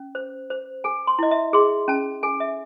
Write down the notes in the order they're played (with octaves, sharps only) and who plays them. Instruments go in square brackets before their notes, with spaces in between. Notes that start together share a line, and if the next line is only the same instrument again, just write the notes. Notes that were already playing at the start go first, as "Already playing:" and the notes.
Already playing: [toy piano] C#4
C5
C5
A4 G#5
C6
E4 D#5
E5
G#4 C6
C#4 A5
A4 G#5
E5